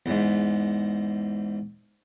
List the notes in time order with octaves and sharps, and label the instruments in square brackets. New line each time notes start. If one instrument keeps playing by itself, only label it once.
[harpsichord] E2 G#2